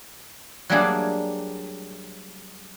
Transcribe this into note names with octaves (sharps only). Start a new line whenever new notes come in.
F#3 G3 A3 A#3 D4 G#4